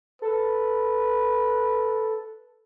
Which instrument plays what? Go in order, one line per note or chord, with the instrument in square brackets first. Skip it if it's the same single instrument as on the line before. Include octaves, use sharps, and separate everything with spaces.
[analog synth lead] A4 [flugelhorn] B4